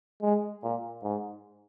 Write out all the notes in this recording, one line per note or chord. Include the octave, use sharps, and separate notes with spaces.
G#3
A#2
G#2